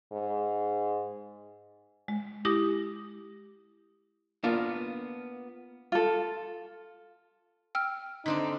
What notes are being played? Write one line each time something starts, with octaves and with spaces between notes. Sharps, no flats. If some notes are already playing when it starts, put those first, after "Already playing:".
G#2
G#3
E4 G4 D6 D#6 A#6
A#3 B3 D4 F4 A#4
F4 A4
G5 E6 F6
D3 C4 D4 D#4